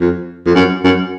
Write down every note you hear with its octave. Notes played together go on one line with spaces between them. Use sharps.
F2
F2
F#2
F#2